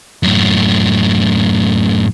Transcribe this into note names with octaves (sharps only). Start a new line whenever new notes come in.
F#2 A2